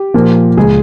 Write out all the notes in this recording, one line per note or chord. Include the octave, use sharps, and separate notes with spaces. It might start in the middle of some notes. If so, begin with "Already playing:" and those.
Already playing: G4
A#2 F3 A#3
C#2 C#3 G#3 G#4